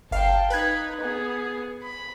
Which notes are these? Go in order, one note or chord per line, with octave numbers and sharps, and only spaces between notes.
G1 F5 G5 A5 C7
D#4 B4 B5 F#6 G#6
B3 G#4
B5